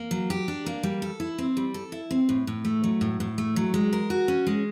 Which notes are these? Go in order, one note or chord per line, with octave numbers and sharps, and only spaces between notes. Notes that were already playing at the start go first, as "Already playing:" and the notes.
Already playing: A#3
F#3
G4
D4
A#3
G3
A4
E4
C4
G3
A4
E4
C4
A2
A2
A3
F#3
A2
A2
A3
F#3
G#3
A#4
F#4
C#4
G#3